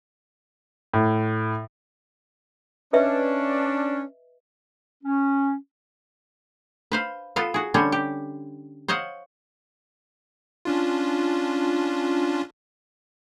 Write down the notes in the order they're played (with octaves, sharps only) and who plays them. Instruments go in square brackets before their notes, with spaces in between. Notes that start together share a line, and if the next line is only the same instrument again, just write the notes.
[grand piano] A2
[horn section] C#4 D4 [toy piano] B4 D#5 E5
[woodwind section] C#4
[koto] B4 C5 F5
B3 F4 A4 F5
F#4 G#4
D3 G3 C#4 C5 C#5
G4
C5 C#5 D#5 F5 F#5
[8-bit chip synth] C#4 D4 F4